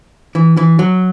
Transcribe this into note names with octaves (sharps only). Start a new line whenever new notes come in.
E3
E3
F#3